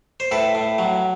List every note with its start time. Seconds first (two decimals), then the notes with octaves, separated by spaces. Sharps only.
0.20 C5
0.31 A2 A4 B4
0.55 A2
0.78 F#3